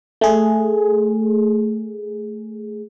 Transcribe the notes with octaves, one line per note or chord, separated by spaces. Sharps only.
A3 G#4